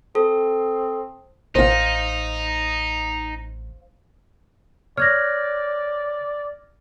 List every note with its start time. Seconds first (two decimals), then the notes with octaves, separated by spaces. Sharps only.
0.15 C4 A4
1.55 A1 D#4 C5 F5
4.97 C#5 D5 F6 F#6 G#6 A#6